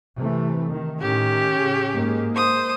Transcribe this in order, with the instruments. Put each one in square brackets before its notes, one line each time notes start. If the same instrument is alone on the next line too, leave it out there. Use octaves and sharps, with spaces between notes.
[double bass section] C3 E3 A3
D#3
[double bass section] A2 D#3 [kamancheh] C#4 G4
[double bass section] C#3
G#2 G#3 A#3
[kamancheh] C5 D#6